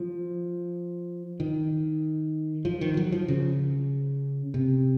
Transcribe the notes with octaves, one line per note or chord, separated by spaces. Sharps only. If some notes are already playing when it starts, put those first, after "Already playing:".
Already playing: F3
D#3
F3
D#3
F#3
F3
C#3
C3